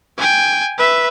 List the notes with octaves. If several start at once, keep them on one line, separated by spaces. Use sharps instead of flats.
G5 G#5
B4 E5